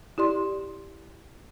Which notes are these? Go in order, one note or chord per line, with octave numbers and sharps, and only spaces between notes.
E4 G4 D5 C6